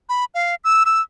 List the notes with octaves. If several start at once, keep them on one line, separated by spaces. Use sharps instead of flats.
B5
F5
E6
E6